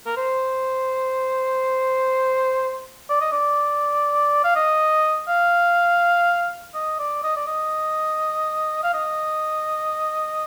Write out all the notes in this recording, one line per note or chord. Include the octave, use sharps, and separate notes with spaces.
A#4
C5
D5
D#5
D5
F5
D#5
F5
D#5
D5
D#5
D5
D#5
F5
D#5